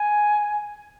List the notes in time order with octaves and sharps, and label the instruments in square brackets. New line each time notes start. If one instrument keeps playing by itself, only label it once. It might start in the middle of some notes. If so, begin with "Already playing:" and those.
Already playing: [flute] G#5